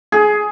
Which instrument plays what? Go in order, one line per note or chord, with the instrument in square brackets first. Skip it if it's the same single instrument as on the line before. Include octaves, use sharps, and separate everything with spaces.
[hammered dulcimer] G#4